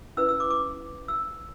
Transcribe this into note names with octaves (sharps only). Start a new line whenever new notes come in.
C#4 E4 B4 E6
E6
D6
D6
E6